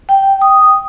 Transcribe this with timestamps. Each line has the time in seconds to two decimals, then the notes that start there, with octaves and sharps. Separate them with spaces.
0.09 G5
0.42 D#6